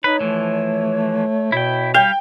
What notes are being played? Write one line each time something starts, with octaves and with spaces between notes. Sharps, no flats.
D#4 B4 C#5
E3 F3 A3
B2 E4 G5
G3 F5 G5